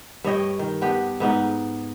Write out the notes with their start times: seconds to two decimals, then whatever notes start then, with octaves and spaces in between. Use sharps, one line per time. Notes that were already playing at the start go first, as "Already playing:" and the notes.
0.24 G2 C#5 D#5 G5
0.59 D#3
0.82 B3 D4 G4
1.20 G#2 B3 D#4